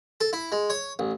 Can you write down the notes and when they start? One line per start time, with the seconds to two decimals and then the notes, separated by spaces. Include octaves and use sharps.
0.21 A4
0.33 E4
0.52 G#3
0.70 C#5
0.99 A1